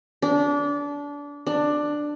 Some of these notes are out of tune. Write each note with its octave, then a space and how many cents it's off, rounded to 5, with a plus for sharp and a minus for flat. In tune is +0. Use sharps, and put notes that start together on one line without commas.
D4 -25
D4 +10